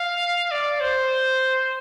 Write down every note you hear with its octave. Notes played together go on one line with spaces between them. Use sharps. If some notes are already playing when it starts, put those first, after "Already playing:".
Already playing: F5
D5
C5